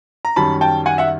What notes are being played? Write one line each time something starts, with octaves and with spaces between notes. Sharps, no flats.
A#5
F#2 D#3 G3 A5 B5
G5 A5
F#5 G#5
E5 F#5